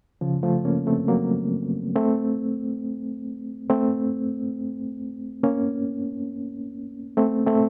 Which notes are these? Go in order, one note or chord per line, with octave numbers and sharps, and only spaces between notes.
C#3 F3
F3 A3
A#3 C#4
A3 C4
F#3 A#3
A3 C4
A3 C4
A#3 C#4
A3 C4
A3 C4